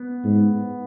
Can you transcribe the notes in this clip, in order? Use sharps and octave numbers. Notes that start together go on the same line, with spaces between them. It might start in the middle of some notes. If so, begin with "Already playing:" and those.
Already playing: B3
G#2